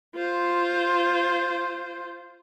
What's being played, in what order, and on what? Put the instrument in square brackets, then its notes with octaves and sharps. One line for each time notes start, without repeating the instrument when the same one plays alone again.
[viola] F4 C5